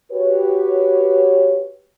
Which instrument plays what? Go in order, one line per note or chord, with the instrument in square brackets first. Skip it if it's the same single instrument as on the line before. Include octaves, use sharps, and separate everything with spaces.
[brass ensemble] F#4 G4 B4 C#5